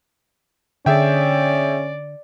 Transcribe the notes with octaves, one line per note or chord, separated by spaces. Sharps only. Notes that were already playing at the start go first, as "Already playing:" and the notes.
D3 C#4 G#4 D5 E5 G5